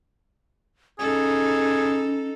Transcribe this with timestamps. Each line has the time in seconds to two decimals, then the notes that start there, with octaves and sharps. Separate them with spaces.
0.99 C#4 D#4 G#4 A4